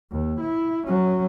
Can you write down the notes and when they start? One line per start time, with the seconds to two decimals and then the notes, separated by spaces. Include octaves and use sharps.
0.11 D#2
0.40 E4
0.87 F#3 C#4